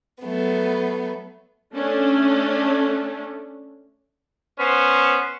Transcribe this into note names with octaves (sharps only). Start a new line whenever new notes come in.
F#3 A3 B3
A3 C#4 D4
B3 C#4 C5